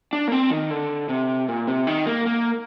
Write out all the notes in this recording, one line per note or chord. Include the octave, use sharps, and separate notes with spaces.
D4
A#3
C4
D#3
D3
C3
A#2
C3
D#3
A#3
A#3